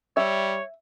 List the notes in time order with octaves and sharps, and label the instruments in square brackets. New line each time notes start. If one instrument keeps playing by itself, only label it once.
[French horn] G3 [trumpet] C#5 [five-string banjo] E5